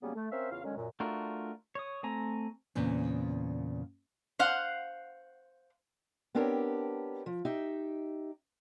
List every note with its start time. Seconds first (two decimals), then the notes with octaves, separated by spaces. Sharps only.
0.01 C#3 F#3 G3 A#3 B3 C#4
0.15 A3
0.31 C4 C#4 A#4 C5 E5 F5
0.50 E2 C#3 F4 F5
0.63 D3 D#3 F#3 G#3 C#4
0.76 F#2 A#2
1.00 A3 D4 F4 F#4 A#4
1.75 C#5 D#6
2.03 A3 C4 G#5 A#5
2.75 E2 A#2 C#3 C4
4.39 C5 F5 F#5
6.35 B3 C4 D4 G4 A#4 C#5
7.26 F3
7.45 D#4 G4 E5